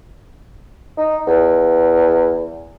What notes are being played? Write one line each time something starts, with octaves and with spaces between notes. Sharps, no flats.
D#4
E2